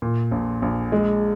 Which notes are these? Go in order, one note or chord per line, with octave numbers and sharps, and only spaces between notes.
A#2
A#1
A#1
G#3